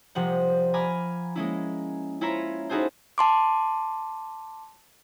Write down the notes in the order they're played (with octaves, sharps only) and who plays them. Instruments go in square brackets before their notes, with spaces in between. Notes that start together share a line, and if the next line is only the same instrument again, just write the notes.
[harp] C2 C3 F3 F#5
G#5 A#5 B5 D6 F6
G#3 A#3 C#4 E4
C#4 E4 F4 C#5 E5 A#5
D#4 E4 F#4 G#4 A4 C5
[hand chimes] A5 C6 D6